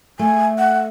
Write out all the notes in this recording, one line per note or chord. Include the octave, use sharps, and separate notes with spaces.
A3 G#5
F#5